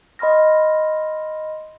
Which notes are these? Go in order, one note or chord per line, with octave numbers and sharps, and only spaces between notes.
D#5 B5 C6 F6 A#6